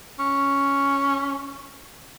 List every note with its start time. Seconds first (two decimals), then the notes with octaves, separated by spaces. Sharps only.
0.19 C#4